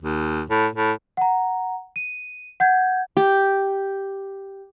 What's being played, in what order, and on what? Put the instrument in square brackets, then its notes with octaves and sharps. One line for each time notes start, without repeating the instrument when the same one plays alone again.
[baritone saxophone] D#2
A2
A2
[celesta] F#5 A#5
D#7
F#5 G6 G#6
[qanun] G4